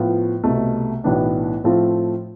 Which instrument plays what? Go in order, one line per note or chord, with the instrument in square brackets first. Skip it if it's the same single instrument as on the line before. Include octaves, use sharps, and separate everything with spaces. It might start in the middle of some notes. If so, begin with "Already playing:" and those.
Already playing: [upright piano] A2 F3 B3 F4
C2 B2 A3
B1 A2 E3 B3 D4
A2 F3 A3 C4 F4